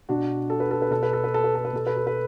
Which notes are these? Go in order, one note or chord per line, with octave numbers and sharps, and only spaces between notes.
B2 D4 F#4
A4
B4
A4
B4
B2 A4
B4
A4
B4
A4
B4
A4
B4
B2 A4
B4
A4
B4